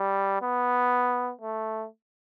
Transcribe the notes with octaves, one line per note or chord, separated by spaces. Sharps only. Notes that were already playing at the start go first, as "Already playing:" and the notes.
Already playing: G3
B3
A3